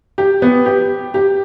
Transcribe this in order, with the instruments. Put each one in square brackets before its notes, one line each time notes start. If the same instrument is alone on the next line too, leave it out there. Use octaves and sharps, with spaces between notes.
[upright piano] G4
B3
G4
G4